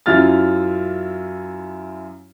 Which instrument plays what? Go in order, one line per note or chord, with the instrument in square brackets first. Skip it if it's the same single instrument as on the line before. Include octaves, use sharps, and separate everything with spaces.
[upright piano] F#2 E4 F4 F6 A6